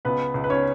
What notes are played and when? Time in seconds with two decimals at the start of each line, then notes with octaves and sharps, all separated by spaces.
0.05 C#2 B3 B4
0.34 C#2
0.44 B4
0.50 C#4 C#5